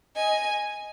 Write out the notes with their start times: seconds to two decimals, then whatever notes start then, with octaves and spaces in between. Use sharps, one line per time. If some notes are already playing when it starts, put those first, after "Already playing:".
0.16 D#5 G#5